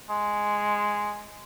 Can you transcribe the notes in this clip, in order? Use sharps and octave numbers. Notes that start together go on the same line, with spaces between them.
G#3